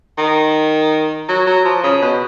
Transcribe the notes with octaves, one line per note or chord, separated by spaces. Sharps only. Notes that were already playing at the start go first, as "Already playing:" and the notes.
D#3
F#3
F#3
F3
C#3
B2